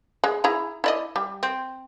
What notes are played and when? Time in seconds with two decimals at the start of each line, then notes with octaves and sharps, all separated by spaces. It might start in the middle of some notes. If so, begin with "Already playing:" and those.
0.24 G#3
0.44 E4 G#4 A#5
0.84 E4 D5 D#5
1.16 G3
1.43 C4